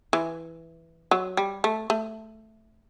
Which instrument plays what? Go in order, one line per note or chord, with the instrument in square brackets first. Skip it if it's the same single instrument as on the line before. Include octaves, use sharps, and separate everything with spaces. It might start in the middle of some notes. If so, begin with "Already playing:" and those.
[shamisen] E3
F#3
G3
A3
A3